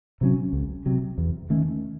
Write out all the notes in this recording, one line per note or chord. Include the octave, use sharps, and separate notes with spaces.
C3 F#3 C#4
C#2
C3 F#3
E2
D#3 A3 C#4